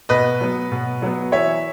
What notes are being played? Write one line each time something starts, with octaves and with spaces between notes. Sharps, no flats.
B2 B4 D#5
F#3 B3
B2
F#3 B3
E3 C#5 E5